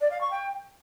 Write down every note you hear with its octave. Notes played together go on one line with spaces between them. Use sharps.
D5
F5
C#6
G5